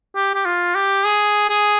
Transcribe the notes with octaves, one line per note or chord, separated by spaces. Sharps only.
G4
G4
F4
G4
G#4
G#4